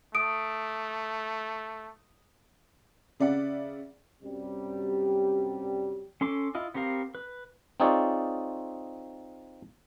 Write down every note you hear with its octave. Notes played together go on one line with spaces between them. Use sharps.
A3 D#6 D7
C#3 D5 E5 F#5
F#2 C3 F#3 G3
C#4 A4 C6 D6
E4 F4 D#5
B3 C4 G4 A#4 F5
B4
C4 D#4 F4 G#4 C#5 D5